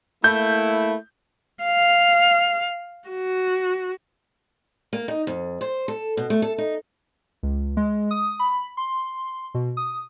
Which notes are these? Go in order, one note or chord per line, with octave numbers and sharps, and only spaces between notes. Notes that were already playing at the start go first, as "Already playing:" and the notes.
A3 A#3 E4 G6
F5
F#4
A#3
D#4
F2
C5
A4
B2
A3
A4
D#4
C#2
G#3
D#6
B5
C6
B2
D#6